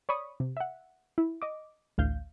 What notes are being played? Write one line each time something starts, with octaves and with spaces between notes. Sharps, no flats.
C#5 D5 B5 C#6 D#6
C3
E5 F#5
E4
D#5 D6
A1 D2 F5 G6